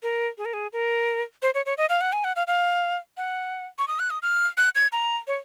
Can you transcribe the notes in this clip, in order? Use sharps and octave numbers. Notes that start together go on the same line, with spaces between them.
A#4
G#4
A#4
G#4
A#4
C5
C#5
C#5
D#5
F5
F#5
G#5
F#5
F5
F5
F#5
C#6
D#6
F#6
D#6
F6
F#6
G#6
A#5
C#5